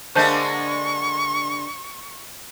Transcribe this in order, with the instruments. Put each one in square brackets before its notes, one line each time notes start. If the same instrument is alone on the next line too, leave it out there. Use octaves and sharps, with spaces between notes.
[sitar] D3 G#3 A#3 [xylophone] C5 A5 G6 [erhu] C#6